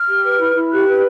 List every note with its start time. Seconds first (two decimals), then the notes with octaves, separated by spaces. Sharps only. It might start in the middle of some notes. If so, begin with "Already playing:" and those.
Already playing: F6
0.09 G4
0.25 B4
0.40 E4
0.56 E4
0.71 G4 F#6
0.87 B4